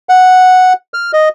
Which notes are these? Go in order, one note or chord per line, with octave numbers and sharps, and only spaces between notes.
F#5
F6
D#5